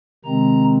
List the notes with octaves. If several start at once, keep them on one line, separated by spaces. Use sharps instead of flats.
C3 D#3 G#3 C4 A#5